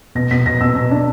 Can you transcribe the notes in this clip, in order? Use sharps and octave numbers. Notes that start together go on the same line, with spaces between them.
B2 A#6
B2 B6
B2 A#6
B2 E6
B2
D4